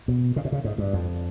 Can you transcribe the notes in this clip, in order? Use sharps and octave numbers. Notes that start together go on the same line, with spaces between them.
B2
C#3
C3
C#3
G#2
G2
F2